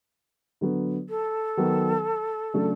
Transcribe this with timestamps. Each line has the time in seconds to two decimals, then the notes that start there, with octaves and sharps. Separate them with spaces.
0.61 D3 F#3 B3
1.09 A4
1.57 D#3 F#3 B3
2.54 C#3 F#3 A3 D4